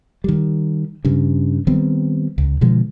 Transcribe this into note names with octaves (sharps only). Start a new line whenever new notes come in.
D#3 G3
G2 C#3
D#3 G3 B3 C4
C#2
B2 D3 F3 G#3